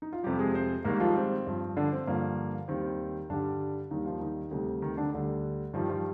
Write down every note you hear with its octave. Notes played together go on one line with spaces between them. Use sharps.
D#4
F4
F2 C3 G3 G4
G#3 G#4
C4 C5
G#2 D#3 G3 A#3 A#4
F3 F4
C4
G2 F3
D3 D4
C4
G2 D3 F3 A#3
D#2 D#3 G3 C4
G2 D3 G3 D4
D#2 D#3 G3 D#4
F3 F4
D#3 D#4
D2 C3 D#3 G3
D#3 D#4
D3 D4
D2 D3 G3
G2 D#3 F3 G3 F4
F3 F4